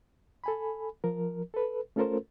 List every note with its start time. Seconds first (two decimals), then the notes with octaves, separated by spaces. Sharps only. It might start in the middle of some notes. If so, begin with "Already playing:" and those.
0.44 A4 G#5 B5
1.04 F3 A#4
1.54 A4 B4
1.96 A3 C#4 F4 A4 A#4 C5